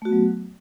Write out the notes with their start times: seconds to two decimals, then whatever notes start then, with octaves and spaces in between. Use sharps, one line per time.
0.02 A3
0.05 F#4
0.09 B3
0.12 F#3